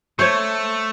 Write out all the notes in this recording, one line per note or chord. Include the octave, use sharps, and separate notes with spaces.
A3 C5 C#5